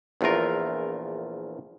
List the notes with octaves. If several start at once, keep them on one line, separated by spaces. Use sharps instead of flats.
A#1 E2 A3 F4 A#4